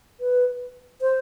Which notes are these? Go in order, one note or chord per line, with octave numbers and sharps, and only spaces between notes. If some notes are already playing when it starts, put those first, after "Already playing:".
B4
C5